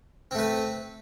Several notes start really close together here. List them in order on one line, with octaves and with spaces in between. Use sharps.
C4 A3 B4